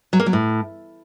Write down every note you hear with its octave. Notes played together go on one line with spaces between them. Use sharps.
F#3
A#3
F#3
A2